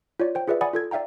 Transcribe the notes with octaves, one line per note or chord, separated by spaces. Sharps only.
F4 C#5 D5
C5 G5
F4 G#4 B4 D5 E5
D5 F#5 G#5 B5 D#6
F4 A4 G#6
D5 E5 F5 G5 A#5